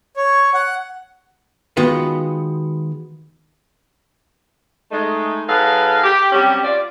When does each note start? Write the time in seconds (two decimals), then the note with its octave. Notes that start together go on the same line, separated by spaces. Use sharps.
0.16 C#5
0.54 F#5
1.77 D#3 G#3 B3 F4 F#4 B4
4.92 G#3 A3 D#4
5.48 F#3 D#4 G#4 A4 B4 F5
6.04 G4
6.32 F#3 G3 C4 C#4 G4
6.63 F4 D5